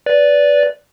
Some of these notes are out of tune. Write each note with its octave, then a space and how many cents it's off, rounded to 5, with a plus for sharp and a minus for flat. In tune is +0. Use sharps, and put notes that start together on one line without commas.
B4 +0 D5 -15